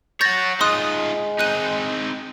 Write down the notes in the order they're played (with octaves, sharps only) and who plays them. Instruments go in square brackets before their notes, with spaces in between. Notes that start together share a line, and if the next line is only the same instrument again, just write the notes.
[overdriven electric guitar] C#5 F#5 [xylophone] G6 A6 A#6
[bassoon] G#3 [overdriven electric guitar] D#4 F4 [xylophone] C6 D#6 F#6
[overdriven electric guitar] C4 D#4 [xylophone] F#6 D#7